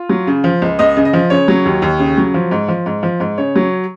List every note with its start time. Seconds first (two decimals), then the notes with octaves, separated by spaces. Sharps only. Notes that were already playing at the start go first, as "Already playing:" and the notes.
Already playing: F4
0.09 F#3
0.27 C#3
0.44 F3
0.62 C#2
0.79 C#2 D#5
0.97 C#3
1.05 D#5
1.13 F3
1.30 C#3 C#5
1.48 F#3
1.65 D#2
1.82 D#2
2.00 C#3
2.18 F#3
2.34 F3
2.51 G#2
2.68 F3
2.86 G#2
3.03 F3
3.20 G#2
3.38 C#3 C#5
3.56 F#3